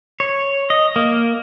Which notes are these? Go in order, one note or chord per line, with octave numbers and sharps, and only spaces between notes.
C#5
D#5
A#3